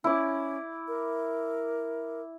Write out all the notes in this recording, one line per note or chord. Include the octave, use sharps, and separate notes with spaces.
C#4 E4 D5
A#4